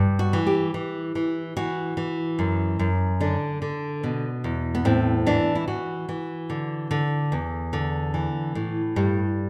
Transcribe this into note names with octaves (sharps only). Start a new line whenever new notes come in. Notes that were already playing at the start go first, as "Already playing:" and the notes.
Already playing: G2
F#4
E3
G4
E3
E3
E3 F#4
E3
F#2
F#2
D3 D4
D3
B2
E2
B3
A2 C4
E3 D4
E4
E3 F#4
E3
D3
D3
E2
D3
E3
A2
G2 G3